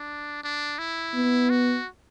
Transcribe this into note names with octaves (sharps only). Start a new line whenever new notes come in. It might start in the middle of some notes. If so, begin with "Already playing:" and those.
Already playing: D4
D4
E4
B3
F#4